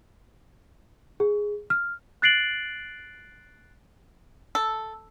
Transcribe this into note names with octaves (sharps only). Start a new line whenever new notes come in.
G#4
F6
F#6 A6 C7 D7 F#7
A4